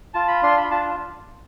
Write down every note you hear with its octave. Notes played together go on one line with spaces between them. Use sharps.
F4 A5
B5
D4 C6
B5
F4 A5